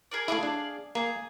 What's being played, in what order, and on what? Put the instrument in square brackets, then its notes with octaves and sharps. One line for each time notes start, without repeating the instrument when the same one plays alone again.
[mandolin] G#4 A#4 D5
[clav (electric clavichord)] A3 E4 [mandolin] G#4 D5 F5
[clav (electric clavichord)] D4
[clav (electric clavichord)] A#3 [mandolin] G#4